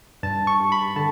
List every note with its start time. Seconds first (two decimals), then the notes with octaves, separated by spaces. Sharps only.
0.23 G2 A5
0.47 C#6
0.60 G2
0.72 B5
0.96 D3 A5